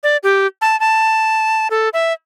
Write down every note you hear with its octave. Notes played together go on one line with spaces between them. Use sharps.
D5
G4
A5
A5
A4
E5